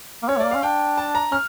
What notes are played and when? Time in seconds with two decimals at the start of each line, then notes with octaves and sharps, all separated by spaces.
0.22 A#3
0.28 C#4 C#5
0.37 A3
0.40 D5
0.45 A#3
0.51 C#4 F5
0.63 D4 G5
0.98 A5
1.15 A#5
1.32 C#4 F6